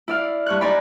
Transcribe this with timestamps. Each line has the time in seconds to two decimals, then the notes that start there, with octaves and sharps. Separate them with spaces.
0.08 E4 D5 F5
0.46 G2 C#6 F#6
0.61 D#4 D5 G#5 B5